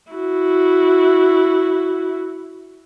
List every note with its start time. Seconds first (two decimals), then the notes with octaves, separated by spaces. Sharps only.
0.12 E4 F#4